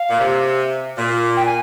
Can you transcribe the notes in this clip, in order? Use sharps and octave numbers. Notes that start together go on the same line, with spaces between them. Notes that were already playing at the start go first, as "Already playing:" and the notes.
Already playing: F5
A#2
C3
A#2
G5
G#5